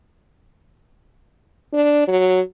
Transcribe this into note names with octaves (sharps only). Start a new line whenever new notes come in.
D4
F#3